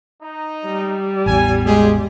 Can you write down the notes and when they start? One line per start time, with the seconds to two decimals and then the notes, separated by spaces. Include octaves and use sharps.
0.22 D#4
0.67 G3
1.26 A1 E2 G#5
1.66 G#3 F4 G4 G#4